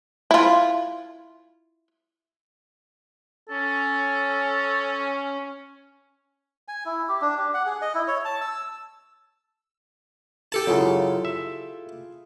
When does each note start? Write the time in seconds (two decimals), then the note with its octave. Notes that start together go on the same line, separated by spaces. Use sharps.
0.31 E4 F4
3.49 C#4 A4
6.68 G#5
6.85 E4
7.09 G4
7.22 D4
7.38 G4
7.54 F#5
7.66 G#4
7.82 D#5
7.94 E4
8.08 C#5
8.25 A5
8.41 E6
10.52 G4 A4 A5
10.67 F#2 C#3 E4 F4 G#4
11.25 E5